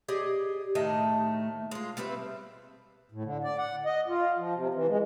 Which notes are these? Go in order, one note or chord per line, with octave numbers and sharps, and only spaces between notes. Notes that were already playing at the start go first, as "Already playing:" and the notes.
G4 G#4 D5 D#5
A2 D#3 A3 D#5
G#3 F4
G3 C4 B4 E5
A2
D3
D5
F#5
D#5
F4
F3
C3
E3
G#3